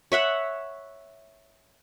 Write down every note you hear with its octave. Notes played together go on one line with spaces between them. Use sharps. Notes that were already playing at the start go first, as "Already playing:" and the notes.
C#5 E5 F#5 B5